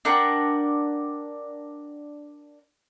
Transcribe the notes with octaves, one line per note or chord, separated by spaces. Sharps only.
D4 A#4 F#5 G5